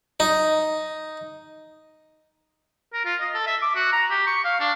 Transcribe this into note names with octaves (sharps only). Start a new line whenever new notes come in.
D#4
A#4
F4
D#5
A4
E5
D6
F#4
A#5
G4
C#6
F5
D4